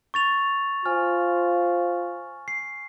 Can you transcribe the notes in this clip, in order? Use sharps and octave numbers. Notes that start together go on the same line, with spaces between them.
C#6 A6 F7
F4 C5 G#5 F6
C7